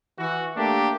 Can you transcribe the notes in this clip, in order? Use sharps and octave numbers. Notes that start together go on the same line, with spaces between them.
E3 F#4
A3 A#3 D4 G4